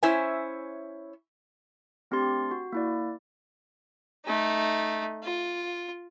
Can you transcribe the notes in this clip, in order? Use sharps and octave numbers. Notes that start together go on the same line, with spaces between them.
C#4 E4 C5 C#5 E5 G#5
A3 C4 D4 G4 C6 A6
F#4
A#3 E4 D5
A3 D#4
F4